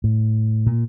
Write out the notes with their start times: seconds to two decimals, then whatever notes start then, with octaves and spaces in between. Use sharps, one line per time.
0.04 A2
0.66 A#2